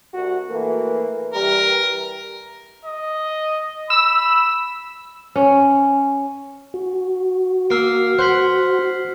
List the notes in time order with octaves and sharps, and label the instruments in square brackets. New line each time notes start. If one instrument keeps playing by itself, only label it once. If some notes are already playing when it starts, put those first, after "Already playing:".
[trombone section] C2 F#4
E3 A3 A#3
[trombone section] E3 G3 [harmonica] A#4
[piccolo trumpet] D#5
[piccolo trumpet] B5 [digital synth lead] E6
[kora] C#4
[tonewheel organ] F#4
[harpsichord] A#3 [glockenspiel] E6 F6 C7
[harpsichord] C5 F#5 [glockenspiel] F#6 B6